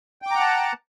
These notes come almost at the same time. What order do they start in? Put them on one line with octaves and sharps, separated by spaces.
G5 D6 A#5 F#5 A5